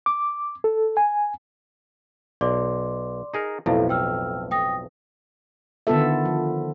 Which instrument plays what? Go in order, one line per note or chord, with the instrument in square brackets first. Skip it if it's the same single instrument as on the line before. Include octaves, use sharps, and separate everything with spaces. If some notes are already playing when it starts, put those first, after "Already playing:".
[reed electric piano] D6
A4
G#5
[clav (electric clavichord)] B1 [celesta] D5 C6 D6
[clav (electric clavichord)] D#4 G#4 A#4
[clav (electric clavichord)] B1 F2 A2 [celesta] E4 A4 F5
[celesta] G5 E6 F6
G5 D#6 A#6
[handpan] D3 D#3 B3 F4 A4 E5
F3